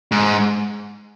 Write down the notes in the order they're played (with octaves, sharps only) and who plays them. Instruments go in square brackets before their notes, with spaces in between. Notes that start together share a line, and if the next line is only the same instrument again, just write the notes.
[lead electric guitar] G#2